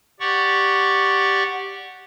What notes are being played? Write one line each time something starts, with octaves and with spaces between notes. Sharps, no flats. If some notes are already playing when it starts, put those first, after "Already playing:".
G4 D5 F#5 C#6